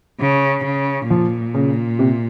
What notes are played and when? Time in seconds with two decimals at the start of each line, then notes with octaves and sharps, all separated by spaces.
0.20 C#3
0.65 C#3
1.09 A#2 F3
1.54 C#3
1.99 C3